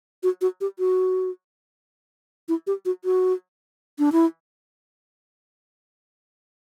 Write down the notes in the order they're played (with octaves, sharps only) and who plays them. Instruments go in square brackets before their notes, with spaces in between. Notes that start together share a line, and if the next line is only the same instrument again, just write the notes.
[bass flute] F#4
F#4
G4
F#4
E4
G4
F#4
F#4
D4
E4